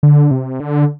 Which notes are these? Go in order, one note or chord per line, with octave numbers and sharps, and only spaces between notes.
D3
C3
D3